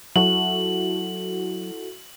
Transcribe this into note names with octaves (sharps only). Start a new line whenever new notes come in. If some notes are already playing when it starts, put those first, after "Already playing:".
F#3 E4 F#4 A4 F#7